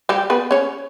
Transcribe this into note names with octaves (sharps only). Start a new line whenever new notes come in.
G3 G4
B3 B4
C#4 C#5